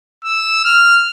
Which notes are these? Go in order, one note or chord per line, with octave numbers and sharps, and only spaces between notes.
E6
F6